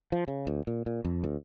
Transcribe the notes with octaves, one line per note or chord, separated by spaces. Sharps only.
F3
C#3
D2
A#2
A#2
F2
D2